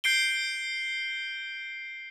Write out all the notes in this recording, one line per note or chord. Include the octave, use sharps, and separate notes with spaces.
G6 C7 D7 G7